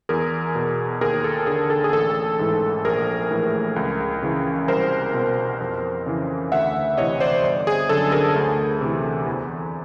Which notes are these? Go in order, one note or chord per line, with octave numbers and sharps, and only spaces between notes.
E2 G#4 A#4
B2
D#2 G#4 A#4
A4
D3 G#4
A4
G#4
A1 A4
G#2 E3
A#1 G#4 A#4
A2 E3
C#2
C#3 E3
C2 A#4 C5
B2
F2
C#3 E3
D2 E5 F#5
C3 E3 C#5 D#5
C5 D5
G1
G#4
F#2 D3 A4
G#4 A#4
D2
C3 E3
E2